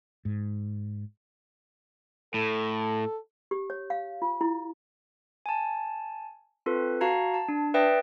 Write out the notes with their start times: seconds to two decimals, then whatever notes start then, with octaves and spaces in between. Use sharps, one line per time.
0.25 G#2
2.34 A2 A4
3.51 G4
3.70 C#5
3.90 F5
4.22 F4
4.41 E4
5.46 G#5 A5
6.66 C4 F4 A4 B4
7.01 F#4 F5 A5 A#5 G#6 C#7
7.34 A5
7.48 D4
7.74 B4 D5 E5 G5 D#6 A#6